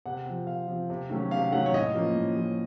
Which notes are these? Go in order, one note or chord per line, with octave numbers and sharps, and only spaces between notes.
C3 F#5
F3 C4
C3 F5
F3 C4
C3
D#3 F#3 A3 C#4
C3 F5
D#3 F#3 A3 C#4 F#5
C#5
A2 D#5
F3 A#3 C#4
A2
F3 A#3 C#4